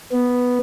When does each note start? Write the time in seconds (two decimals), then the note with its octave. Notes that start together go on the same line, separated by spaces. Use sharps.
0.12 B3